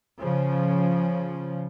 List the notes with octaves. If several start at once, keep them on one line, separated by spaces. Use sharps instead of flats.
C#3 F3